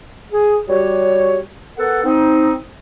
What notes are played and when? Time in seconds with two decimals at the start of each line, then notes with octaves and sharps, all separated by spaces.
0.31 G#4
0.68 G3 F#4 G4 C#5
1.77 B3 A4 A#4 F#5
2.04 C4 D#4